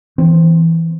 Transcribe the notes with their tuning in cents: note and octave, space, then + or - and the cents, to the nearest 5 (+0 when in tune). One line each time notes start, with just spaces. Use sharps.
E3 +0 C4 +0